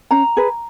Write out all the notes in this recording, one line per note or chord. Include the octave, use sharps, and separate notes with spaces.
C#4 A#5
G#4 B4